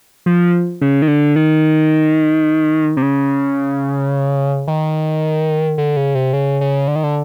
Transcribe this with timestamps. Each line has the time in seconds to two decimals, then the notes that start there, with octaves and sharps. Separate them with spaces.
0.26 F3
0.81 C#3
1.02 D#3
1.08 D3
1.36 D#3
2.97 C3
3.02 C#3
4.67 D#3
5.78 D3
5.97 C#3
6.15 C3
6.33 C#3
6.61 C#3
6.88 D3
6.96 D#3
7.03 D3